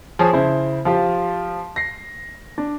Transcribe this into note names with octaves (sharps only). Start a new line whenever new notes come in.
F3 G#4 C#5
C#3 E4 C5
F3 F4 G4
A#6 C7
D4